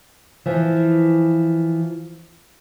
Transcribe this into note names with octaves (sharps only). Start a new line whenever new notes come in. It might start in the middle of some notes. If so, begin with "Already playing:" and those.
E3 F3